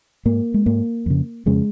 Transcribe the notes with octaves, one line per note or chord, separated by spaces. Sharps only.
G#2 A#3
G#3
G#2 A#3
F2 C#3
F2 C#3 G#3